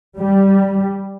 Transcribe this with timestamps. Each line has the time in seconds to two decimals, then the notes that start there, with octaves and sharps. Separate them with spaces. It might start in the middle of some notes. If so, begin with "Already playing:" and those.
0.18 G3